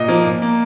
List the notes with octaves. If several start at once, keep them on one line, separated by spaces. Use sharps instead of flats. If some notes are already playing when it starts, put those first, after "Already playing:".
Already playing: A#2 D#5
F3 A#3
A#2
A#3